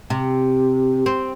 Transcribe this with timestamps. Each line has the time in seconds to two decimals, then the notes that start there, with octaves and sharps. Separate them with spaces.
0.10 C3
1.06 C4